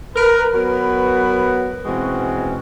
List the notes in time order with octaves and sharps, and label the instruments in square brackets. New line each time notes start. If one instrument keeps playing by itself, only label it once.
[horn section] A#4 B4
F#3 B3 F#4 A#4 B4
B2 E3 G#3 C4 C#4 F#4